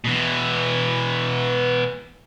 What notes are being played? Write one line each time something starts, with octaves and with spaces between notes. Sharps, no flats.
B2 E3